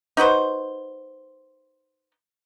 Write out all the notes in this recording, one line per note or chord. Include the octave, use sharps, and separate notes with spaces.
D#4 F#4 B4 C5